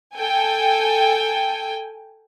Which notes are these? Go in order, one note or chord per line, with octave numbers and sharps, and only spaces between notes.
A4 G5 G#5